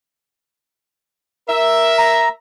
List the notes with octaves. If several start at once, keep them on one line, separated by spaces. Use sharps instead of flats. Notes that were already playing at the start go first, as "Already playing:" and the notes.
A#4 E5
A#5